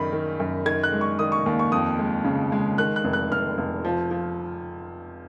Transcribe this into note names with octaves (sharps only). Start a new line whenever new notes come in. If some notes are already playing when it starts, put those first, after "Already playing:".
Already playing: F#2 D#3 B5
D#3
F#2
D#3 G#6
F#6
G#3
C#6
D#3 D#6
C#6
D#2
C#6
F2 D#6
G#3
C#3
G#3
D#3 F#6
F#6
F1
F#6
F1 F6
F1
F3
F3